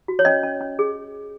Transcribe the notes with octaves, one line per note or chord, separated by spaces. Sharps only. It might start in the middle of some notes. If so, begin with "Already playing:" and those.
F#4
C#5
C#4 D#5
C#4
C#4
G#4